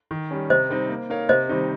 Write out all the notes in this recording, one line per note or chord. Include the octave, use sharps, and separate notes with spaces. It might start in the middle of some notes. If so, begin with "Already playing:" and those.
D#3
G3 C#4
C3 C5 D#5
G3 C4 D#4
A#3
D#4 A#4 C#5 F5
C3 C5 D#5
D#3 G3 C4 D#4